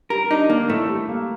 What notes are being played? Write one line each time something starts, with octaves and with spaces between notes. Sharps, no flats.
G3 A#4
D4 D#4
D#3 A#3
A2 A3
G3
A#3